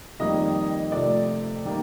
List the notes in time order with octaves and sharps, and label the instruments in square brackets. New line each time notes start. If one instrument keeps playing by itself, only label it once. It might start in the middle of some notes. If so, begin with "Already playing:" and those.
[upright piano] F2 D#3 G3 A#3 D#5
C3 F3 A3 D5
D#3 G3 A#3